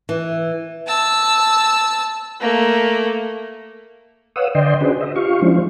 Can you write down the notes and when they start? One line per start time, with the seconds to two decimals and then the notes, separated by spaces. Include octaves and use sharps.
0.09 E3
0.87 A5 E6
2.40 A3 A#3
4.36 B4 C#5 F5 F#5 D#6 E6
4.55 D3 D5 D#5 G5 C6
4.81 C#4 D4 F#4 G#4 B4 C5
5.01 D#5 E5
5.16 F4 G4 F5 C#6
5.42 F3 G#3 C#4 D4 E4 C5